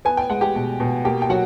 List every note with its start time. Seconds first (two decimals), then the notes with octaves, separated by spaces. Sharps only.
0.05 B3 G#5
0.17 G5
0.30 G#3 F#5
0.41 G4 G5
0.55 B2
0.80 B2
1.05 A#3 G4 G5
1.22 G5
1.29 F#3 F#4 F#5